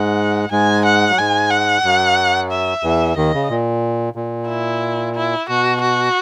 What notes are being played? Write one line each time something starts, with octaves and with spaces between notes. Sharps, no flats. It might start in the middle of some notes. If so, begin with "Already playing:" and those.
Already playing: G#2 G#3 F#5
G#2 G#3 G#5
F#5
F#3
G#2 G#3 G#5
F#5
F#2 F#3
E5
E2 E3
D#2 D#3 D#5
C#3
A#2
A#2
E4
E4
B2 F#4
F#4